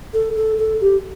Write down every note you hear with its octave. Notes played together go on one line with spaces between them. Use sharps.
A4
A4
A4
G4